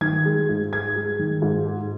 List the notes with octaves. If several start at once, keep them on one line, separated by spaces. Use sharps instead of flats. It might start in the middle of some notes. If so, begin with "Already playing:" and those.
D#3 G#6
G#3
G#2
G#3 G#6
G#3
D#3
G#2
G#3